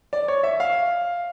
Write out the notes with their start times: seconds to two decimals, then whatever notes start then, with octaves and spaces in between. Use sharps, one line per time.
0.13 D5
0.28 C#5
0.43 E5
0.60 F5